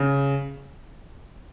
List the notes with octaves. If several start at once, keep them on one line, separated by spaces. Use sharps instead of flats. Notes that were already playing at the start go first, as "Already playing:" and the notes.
Already playing: C#3